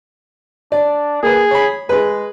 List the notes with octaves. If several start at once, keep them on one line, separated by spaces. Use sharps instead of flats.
D4 D5
A#3 G#4 B4
C#5 B5
G#3 G#4 B4